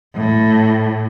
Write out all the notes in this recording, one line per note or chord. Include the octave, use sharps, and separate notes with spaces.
A2